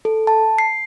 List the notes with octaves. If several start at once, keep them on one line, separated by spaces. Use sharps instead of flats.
A4
A5
C7